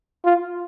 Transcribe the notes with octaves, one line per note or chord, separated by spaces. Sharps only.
F4